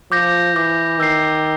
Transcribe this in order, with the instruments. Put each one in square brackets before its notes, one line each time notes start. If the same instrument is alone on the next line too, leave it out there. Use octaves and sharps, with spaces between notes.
[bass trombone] F3 [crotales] D6 G6 A#6
[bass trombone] E3 [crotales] D6 G6 A#6
[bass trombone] D#3 [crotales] E6 G6 C7